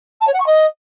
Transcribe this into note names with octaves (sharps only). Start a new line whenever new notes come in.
A5
C#5
F#5
C#6
D#5